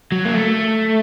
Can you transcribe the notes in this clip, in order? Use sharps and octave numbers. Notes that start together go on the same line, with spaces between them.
F#3
A#3
A3